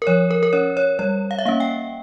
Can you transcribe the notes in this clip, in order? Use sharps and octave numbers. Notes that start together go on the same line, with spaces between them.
A#4
F3 C#5
A#4
A#4
C#4 C#5
C#5
G3 C#5
F5
E5
A#3 C#4 F5
G5